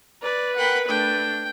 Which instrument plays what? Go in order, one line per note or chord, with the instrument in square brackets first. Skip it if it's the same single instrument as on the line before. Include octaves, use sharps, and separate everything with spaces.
[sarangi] B4 [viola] D5
[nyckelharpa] A#4 B5 [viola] F#5 G5
[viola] A3 D4 [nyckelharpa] G5